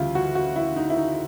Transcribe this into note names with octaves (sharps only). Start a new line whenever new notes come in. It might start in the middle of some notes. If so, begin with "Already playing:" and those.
Already playing: D2 C#3 E3 G3 E4 F4
F#4
F#4
E4
D#4
E4
D#4